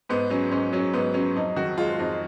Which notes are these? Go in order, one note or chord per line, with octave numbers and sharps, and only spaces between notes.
G#2 B3
F#3 C#4
G#2 C#4
F#3 C#4
G#2 B3
F#3 C#4
F2 D#4
D#3 F#4
G#3 F4
F2 D#4